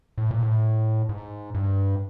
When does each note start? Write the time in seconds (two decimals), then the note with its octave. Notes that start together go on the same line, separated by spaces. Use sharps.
0.18 A2
0.31 A#2
0.43 A2
1.09 G#2
1.54 G2